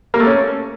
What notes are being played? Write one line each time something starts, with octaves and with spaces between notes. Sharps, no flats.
A#3
A3
C#4